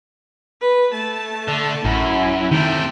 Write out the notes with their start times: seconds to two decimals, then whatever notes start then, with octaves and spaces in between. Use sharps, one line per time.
0.61 B4
0.92 A3 A5
1.48 D3
1.85 A1 F#2 E4
2.52 C3 D#3 A3 G5